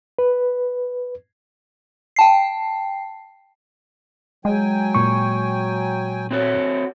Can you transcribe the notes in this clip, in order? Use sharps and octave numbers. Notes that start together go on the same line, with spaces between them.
B4
G5 A5 C7
F#3 G#3 G5 G#5
A#2 C#6
C4 F#4 C#5